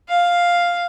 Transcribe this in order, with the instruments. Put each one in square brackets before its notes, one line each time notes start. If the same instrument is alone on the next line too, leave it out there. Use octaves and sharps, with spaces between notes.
[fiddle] F5